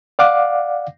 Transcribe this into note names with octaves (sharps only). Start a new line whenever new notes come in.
D5 F5 F#5 D6